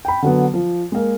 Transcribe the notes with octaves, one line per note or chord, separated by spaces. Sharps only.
G5 B5
D3 F#3 B3
F3
G#3 A#3